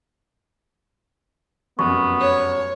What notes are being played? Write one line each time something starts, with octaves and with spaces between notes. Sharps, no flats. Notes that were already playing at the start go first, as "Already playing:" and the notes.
F1 F#2 B3 C#6
C#5